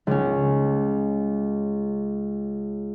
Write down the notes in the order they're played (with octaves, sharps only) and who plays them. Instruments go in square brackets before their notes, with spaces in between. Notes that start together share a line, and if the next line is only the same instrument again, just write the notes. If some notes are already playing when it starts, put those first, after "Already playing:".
[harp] C#2 C#4